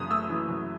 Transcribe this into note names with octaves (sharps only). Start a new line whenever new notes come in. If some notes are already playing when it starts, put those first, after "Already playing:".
Already playing: F#1 F#2 E3 D#6
A3 E6
E3
F#2